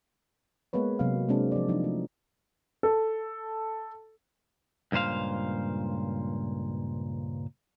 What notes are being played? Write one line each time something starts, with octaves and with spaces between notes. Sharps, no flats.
G#3 A#3 B3 B4 C#5
C3 F#3 A#3 G#4 F5
C3 G#3 A#3 C4 D4
F3 D5
F3 F#3 D4 D#4
A3
A4
C#2 G2 A#2 C5 F5